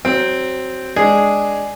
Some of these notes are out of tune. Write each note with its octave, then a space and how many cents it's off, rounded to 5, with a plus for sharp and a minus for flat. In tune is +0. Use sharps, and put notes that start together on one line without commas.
F#3 +20 C4 +0
G#3 +0 D4 +0 G#4 +0